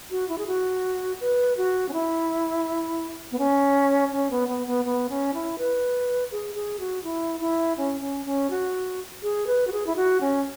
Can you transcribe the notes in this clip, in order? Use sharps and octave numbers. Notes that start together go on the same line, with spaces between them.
F#4
E4
G#4
F#4
B4
F#4
C#4
E4
B3
C#4
C#4
B3
B3
B3
B3
C#4
E4
B4
G#4
G#4
F#4
E4
E4
C#4
C#4
C#4
F#4
G#4
B4
F#4
G#4
E4
F#4
C#4